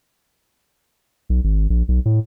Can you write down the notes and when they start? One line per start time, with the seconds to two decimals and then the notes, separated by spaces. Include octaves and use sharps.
1.30 B1
1.44 G#1
1.70 A#1
1.88 B1
2.05 A2